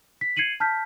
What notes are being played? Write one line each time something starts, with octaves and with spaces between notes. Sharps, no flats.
B6
G#6 C7 C#7 D#7 F#7
A5 F6 G6 B6